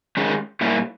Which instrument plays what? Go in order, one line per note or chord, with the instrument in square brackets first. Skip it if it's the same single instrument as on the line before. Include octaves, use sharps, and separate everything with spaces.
[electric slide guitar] D#3 G#3 C#4 G4
A#2 G3 A#3 C#4 E4